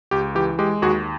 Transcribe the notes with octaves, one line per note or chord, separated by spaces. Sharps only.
C#2 G4
E3 G4
G#3 G4
D#2 F#4 G#4